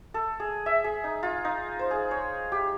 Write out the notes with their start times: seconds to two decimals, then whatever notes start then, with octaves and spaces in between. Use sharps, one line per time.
0.14 A4
0.40 G#4
0.66 E5
0.84 G#4
1.04 D#4
1.23 F4
1.45 D#4
1.79 C5
1.91 G#4
2.11 C#5
2.52 G4